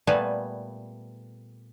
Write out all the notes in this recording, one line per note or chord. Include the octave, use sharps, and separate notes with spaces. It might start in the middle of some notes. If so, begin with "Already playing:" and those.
A#2 G3 A3 B3 B4 G#5